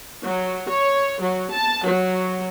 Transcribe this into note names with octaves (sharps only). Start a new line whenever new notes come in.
F#3
C#5
F#3
A5
F#3